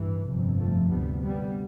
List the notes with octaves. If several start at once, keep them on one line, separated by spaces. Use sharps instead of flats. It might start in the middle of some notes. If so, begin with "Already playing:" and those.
Already playing: A1 G2 E3
G1 F2 C3
F3 A3
D2 C3 G3 B3
G3 B3